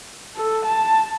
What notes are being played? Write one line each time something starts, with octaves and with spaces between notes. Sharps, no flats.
A4
A5